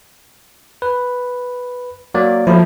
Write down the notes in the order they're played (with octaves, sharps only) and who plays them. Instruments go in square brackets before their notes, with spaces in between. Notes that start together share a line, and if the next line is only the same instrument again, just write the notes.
[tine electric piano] B4
F#3 A#3 D5
[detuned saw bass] F3 [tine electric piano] F#3 A3 E4